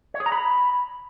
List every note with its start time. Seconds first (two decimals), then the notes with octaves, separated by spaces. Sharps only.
0.14 C#5
0.20 G#4
0.26 A#5
0.32 B5